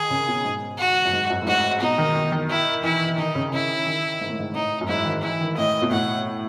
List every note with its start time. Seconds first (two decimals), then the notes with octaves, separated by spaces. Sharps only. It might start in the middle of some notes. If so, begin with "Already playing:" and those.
Already playing: D#3 G#4
0.10 C#3
0.28 B2
0.45 G#2
0.78 F#4
1.05 F#2
1.13 G#2
1.30 F#2
1.42 A2
1.47 G#2 F#4
1.81 B2 D#4
1.98 D#3
2.15 D#3
2.32 D#3
2.50 E4
2.83 E3 E4
3.06 E3
3.18 D#3 D#4
3.35 C#3
3.52 C#3 E4
3.87 D#3
4.21 G#2
4.30 A2
4.39 G#2
4.55 A2 D#4
4.81 F#2
4.88 G#2 E4
5.06 D#3
5.23 E3 E4
5.41 D#3
5.57 A2 D#5
5.82 B2
5.91 A2 F#5